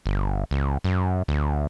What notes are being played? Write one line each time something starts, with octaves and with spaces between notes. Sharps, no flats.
G1
C#2
F#2
D2